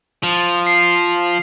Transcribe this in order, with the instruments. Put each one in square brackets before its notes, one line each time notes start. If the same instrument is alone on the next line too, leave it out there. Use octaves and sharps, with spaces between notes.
[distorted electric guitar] F3 [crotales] F7
[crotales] C7